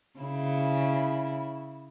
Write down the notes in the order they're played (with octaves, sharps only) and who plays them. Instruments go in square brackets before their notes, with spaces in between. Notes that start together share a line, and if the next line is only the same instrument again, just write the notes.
[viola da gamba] C#3 E4